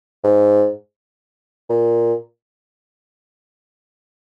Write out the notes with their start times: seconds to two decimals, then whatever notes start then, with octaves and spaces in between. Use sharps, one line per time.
0.24 G#2
1.69 A#2